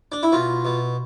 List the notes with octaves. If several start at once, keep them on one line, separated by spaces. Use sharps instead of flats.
D4
E4
B2 F4
B2